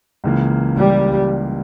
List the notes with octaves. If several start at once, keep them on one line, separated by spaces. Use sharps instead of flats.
C#2 C#3 E3 A#3
G3